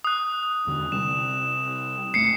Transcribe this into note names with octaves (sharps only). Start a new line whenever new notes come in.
D#6 F#6
E2 D3
C3 G3 E7
G1 A3 C7 C#7